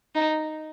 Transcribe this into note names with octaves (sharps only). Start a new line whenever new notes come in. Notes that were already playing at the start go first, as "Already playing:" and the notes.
D#4